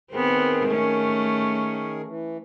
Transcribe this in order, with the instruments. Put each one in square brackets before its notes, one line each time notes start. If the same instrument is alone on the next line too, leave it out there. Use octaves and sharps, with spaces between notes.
[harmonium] D#3 G#4 A#4 [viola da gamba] B3 C4
[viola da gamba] A3 C#4
[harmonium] E3